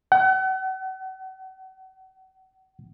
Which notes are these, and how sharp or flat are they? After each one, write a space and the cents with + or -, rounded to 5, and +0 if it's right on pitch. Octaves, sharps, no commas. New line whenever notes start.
F#5 +40